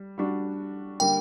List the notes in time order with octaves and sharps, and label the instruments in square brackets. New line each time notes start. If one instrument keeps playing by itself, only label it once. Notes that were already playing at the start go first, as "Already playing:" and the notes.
Already playing: [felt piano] G3
G3 D4 F#4
[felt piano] D3 G3 A#3 [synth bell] G5